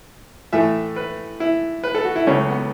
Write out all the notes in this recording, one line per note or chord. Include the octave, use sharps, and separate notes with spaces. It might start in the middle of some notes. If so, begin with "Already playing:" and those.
A2 E3 A3 E5
B4
E4
B4
A4
F#4
E4
C#2 C#3 F#3 A3 C#4
B3